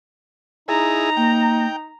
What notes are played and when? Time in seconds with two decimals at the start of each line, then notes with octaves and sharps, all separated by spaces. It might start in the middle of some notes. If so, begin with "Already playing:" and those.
0.69 D#4 E4 G#4 A#5
1.17 A#3 G5